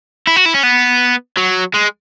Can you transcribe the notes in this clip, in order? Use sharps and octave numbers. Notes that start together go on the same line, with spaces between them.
E4
F#4
E4
C#4
B3
F#3
G#3